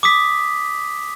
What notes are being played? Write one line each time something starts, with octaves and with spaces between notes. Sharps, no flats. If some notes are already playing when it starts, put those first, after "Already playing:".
D6 D#6 B6